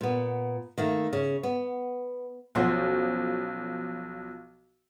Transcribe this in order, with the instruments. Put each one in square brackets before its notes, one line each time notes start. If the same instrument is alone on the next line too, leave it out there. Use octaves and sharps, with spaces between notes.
[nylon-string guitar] A#2 B3
D#3 A3 A#3
C#3
B3
[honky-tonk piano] B1 F3 [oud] C#4 F#4 C5